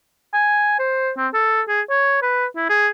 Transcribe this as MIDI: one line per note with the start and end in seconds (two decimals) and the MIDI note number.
0.33 0.76 80
0.79 1.12 72
1.17 1.28 60
1.34 1.62 69
1.68 1.81 68
1.90 2.20 73
2.22 2.46 71
2.56 2.67 64
2.69 2.88 68